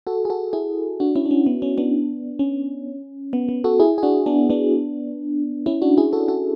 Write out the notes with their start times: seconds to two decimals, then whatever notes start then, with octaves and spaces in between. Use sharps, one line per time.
0.07 F#4 A4
0.25 G#4
0.30 F#4 A4
0.53 E4 G#4
1.00 D4 F#4
1.15 C#4 E4
1.26 D4
1.31 C#4
1.46 B3
1.62 C#4
1.78 B3 D4
2.39 C#4
3.33 B3
3.49 B3
3.64 F#4 A4
3.80 E4 G#4
3.98 G#4
4.03 D4 F#4
4.26 B3 D4
4.50 B3 D4
5.66 C#4 E4
5.82 D4 F#4
5.97 E4 G#4
6.13 F#4 A4
6.28 F#4 A4